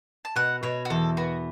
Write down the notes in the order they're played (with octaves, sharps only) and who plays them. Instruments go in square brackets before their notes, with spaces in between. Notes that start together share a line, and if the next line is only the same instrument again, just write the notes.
[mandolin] A5
[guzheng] B2 [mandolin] F#5
[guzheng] B2 [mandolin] C#5
[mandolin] F#4
[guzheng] E2 [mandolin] A4
[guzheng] B3 [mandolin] F#4